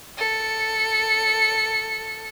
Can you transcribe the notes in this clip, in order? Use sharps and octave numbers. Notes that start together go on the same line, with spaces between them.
A4 C#7